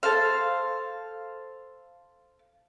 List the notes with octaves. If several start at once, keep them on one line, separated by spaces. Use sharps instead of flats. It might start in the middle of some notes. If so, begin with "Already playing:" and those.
A4 C5 F5